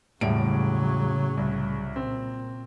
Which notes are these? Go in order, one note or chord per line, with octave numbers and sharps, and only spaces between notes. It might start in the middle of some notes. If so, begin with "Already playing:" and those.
E1 A2 C#3 F#3 G3 D7
C2
A#2 C4